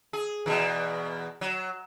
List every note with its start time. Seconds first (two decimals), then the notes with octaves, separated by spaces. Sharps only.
0.13 G#4
0.46 E2 B2 D#3
1.41 F#3